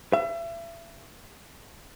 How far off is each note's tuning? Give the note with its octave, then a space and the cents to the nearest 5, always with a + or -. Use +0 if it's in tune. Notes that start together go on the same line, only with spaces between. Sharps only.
E5 +35